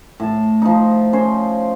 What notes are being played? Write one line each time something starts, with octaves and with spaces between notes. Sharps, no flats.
A2 A5
F3 D#4
C#4 C5